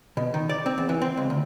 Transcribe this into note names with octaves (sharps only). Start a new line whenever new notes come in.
B2
D#3
D5
C4
E2
E3
C4
C#2
D2